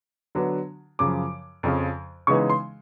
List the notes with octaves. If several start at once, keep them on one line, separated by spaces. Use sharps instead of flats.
D3 F#3 B3 D4
F#2 C#3 F3 D6
F2 C#3 F3
C#3 E3 G#3 B3 D#4 C#6
C6